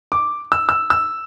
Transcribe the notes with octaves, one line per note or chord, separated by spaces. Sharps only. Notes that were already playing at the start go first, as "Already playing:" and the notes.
D6
E6
E6
E6